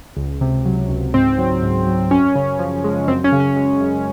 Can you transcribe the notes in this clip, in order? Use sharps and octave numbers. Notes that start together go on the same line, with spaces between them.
C#2
C3
F#3
C#2
G#2 C4
F#3
G#2
F#3
F#2 C#4
C#3
F3
G#3
F#2 C4
C#4
C#3
C#4
G#3
F#2